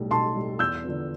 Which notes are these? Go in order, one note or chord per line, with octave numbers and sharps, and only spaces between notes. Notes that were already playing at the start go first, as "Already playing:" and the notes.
Already playing: B1 A2 G3
B1 A5 C6
A2 G3
E2 E6 G6
D3 F3 B3